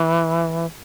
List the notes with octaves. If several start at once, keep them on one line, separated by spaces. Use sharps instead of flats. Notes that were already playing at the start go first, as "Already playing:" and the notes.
Already playing: E3